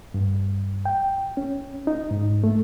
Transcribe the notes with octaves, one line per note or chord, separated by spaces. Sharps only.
G2
G5
C#4
D#4
G#2
A3